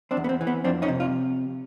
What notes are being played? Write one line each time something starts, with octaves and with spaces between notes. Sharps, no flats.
C4 D4
E2
B3
C4
E3
B3
F2 C4 D4
C#4 D#4
C3
F4